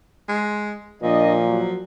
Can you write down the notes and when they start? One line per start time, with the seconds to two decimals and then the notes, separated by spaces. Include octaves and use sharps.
0.29 G#3
1.02 A#2 F3 D4 D5 D#5
1.45 F#3